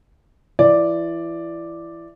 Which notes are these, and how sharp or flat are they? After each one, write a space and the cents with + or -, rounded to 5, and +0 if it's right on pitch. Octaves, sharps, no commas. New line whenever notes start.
E3 +25 D5 +0